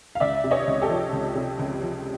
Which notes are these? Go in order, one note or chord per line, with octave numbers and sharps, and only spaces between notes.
F5
C#2 D5 E5
C3
C#5 D#5
C#2
G4 A4
F3
C#2
C3
C#2
F3